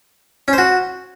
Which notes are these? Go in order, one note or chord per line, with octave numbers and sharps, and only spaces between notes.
C#4
C5
F#4